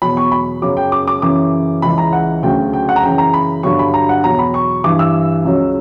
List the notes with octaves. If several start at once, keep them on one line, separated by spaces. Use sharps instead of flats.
E2 B2 F#3 B5
C#6
B5
F#2 C#3 F#3 D6
G5
D6
D6
F#2 C#3 E3 D6
C#2 C#3 E3 B5
A#5
F#5
D2 C#3 F#3 G5
G5
F#5
A#5
F#2 C#3 E3 G5
A#5
B5
G2 D3 F#3 C#6
B5
A#5
F#5
E2 B2 F#3 A#5
B5
C#6
G2 E3 D6
E6
C#2 C#3 F#3